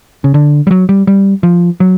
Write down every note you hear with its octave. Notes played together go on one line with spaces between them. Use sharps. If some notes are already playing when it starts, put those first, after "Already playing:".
C#3
D3
G3
F#3
G3
G3
F3
F#3